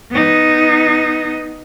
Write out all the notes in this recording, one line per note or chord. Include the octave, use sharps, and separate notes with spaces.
B3 D#4